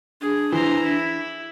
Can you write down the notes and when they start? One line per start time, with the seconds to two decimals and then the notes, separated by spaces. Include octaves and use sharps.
0.21 D4 G#4
0.52 E3 C5 A#5
0.83 E4